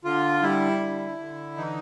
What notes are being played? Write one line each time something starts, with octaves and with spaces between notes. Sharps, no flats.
D3 F4
G3 E4
D3
D3
E3 D#4